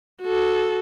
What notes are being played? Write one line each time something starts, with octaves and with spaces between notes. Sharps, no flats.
F#4 A4